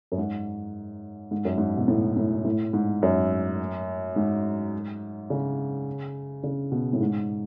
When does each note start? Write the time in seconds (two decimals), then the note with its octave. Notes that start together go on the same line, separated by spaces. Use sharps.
0.12 F#2
0.18 G#2
1.31 G#2
1.45 F#2
1.58 G#2
1.77 B2
1.88 A2
2.17 A2
2.45 A2
2.73 G#2
3.03 F#2
4.16 G#2
5.30 C#3
6.43 C#3
6.72 B2
6.93 A2
7.01 G#2